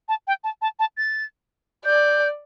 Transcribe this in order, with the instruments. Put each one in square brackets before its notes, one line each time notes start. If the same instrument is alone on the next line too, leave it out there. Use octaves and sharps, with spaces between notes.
[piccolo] A5
G5
A5
A5
A5
A6
[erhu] D5 [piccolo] G6